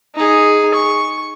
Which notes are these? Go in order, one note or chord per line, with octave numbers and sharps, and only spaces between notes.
D#4 G#4
C#6